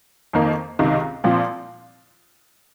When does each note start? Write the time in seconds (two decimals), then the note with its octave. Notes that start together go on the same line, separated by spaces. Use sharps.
0.33 F2 D#3 A#3
0.79 C#2 C3 D#3
1.24 A#2 F3 C4 F4